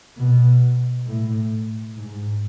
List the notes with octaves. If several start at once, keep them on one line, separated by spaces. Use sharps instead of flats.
B2
A2
G#2